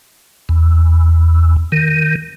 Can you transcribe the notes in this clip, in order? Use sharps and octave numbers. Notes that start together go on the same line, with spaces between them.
E2
D#3